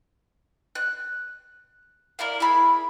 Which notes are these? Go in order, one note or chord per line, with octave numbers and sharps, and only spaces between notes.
F#6
A#3 E4 A#4 D5
E4 G#4 B5